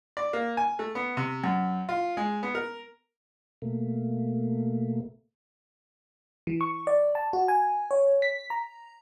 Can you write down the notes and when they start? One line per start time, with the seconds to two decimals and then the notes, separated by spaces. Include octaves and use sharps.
0.17 D5
0.33 A#3
0.57 G#5
0.79 A3
0.95 B3
1.17 C3
1.44 F#2
1.89 F4
2.17 G#3
2.43 B3
2.55 A#4
3.62 B2 A3 A#3
6.47 E3
6.61 C#6
6.87 D5
7.15 A5
7.33 F#4
7.48 G#5
7.91 C#5
8.22 B6
8.50 A#5